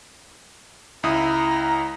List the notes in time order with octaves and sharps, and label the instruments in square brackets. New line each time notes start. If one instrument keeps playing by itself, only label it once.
[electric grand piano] C#2 E4 D#6 [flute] A#5